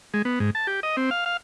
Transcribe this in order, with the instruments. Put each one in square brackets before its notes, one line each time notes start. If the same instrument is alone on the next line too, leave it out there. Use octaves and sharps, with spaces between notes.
[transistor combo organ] G#3
B3
G#2
A5
G4
D#5
C4
F5
F5